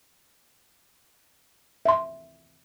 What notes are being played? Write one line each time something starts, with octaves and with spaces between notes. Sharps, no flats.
E5 C6